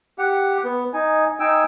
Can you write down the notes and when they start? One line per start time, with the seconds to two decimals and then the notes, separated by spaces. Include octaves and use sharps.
0.18 G4 F#5
0.64 B3
0.93 D#4 G#5
1.40 D#4 G5 G#5 E6